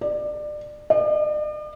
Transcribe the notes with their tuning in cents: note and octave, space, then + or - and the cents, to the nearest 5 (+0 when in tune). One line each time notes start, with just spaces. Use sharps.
D5 +25
D5 +45